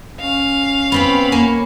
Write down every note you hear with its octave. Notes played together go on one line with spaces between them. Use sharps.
C#4 F5
B3 C4 G4 B5
A#3 C#5 G#5